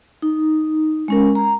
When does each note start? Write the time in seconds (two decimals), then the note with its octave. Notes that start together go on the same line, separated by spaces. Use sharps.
0.22 D#4
1.08 G#3 C#4 A#4
1.35 A#5